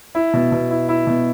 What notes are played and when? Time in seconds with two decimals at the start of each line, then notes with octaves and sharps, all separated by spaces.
0.15 E4
0.34 B2
0.52 B2
0.71 E4
0.89 E4
1.07 B2